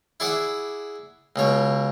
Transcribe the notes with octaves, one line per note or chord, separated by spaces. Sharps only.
E4 G#4 D5 E5 F#5
C#2 B2 C#5